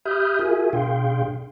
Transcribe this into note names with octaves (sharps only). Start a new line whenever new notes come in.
G4 E5 B5 D#6 F6 G6
F4 F#4 G#4 A#4 E5 G#5
B2 D4 G#4 F5 G5 C6